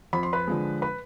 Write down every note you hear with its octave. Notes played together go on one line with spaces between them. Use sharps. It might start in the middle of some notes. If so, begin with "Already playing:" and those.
F2 B5
C6
B4 B5
D3 F3 G#3
B4 B5